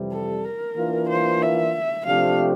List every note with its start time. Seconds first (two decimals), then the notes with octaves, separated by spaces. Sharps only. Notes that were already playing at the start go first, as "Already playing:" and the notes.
Already playing: F2 C3 E3 G3
0.12 A4
0.45 A#4
0.76 E3 A#3 D4 F4
1.10 C5
1.42 E5
2.07 C3 F3 A3 D4 G4 F5